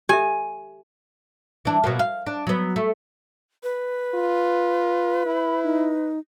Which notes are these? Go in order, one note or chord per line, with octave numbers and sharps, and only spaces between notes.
G4 A4 E5 G#5
E3 D4
B2 F#3 A#3
F5
D4
F#3 B3
A3
B4
F4
E4 B5
D#4